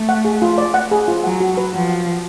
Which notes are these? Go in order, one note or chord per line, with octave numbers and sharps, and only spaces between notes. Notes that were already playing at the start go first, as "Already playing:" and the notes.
Already playing: A3
F#5
G#4
F4
D5
F#5
G#4
F4
F#3 F#5
F#4
B4
F3 F#4
F#5
F#4